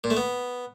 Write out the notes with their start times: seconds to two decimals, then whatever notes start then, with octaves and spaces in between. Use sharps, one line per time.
0.04 A#2
0.10 A3
0.17 B3